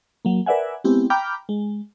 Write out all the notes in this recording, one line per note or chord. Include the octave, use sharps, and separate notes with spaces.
F#3 A#3
A#4 B4 D5 E5 F#5 G#5
G#3 B3 C4 E4 G4
G5 A#5 B5 D6 F6 G6
G#3